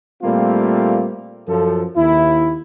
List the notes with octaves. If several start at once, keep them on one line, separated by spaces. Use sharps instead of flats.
A#2 G3 A3 A#3 C4 F4
F#2 F3 A4
D#2 E4